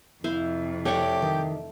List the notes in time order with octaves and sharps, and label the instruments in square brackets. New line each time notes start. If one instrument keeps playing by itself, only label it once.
[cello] F2 C3 [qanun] E4 C5 F5
[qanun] A3 F#5 C#6 [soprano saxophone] G4 [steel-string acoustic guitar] C#5 D5
[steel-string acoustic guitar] D#3